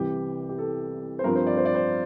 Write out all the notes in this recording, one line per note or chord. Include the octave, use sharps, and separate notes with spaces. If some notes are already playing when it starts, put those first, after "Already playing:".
Already playing: C2 C3 E3 G4
G4
A4
C5
G2 F3 C4 A#4
C5
D5
C5
D5
C5